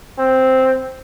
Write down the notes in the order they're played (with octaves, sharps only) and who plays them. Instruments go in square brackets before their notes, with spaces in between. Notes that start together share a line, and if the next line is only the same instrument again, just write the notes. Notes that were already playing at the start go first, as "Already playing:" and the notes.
[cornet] C4